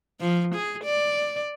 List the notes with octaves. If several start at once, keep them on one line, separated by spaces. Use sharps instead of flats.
F3
G#4
D5